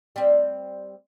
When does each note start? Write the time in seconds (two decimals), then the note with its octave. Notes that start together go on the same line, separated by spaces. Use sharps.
0.16 G3 C4